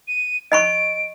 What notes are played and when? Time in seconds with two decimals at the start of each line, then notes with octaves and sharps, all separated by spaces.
0.08 D#7
0.52 D#5 B5 C#6 D7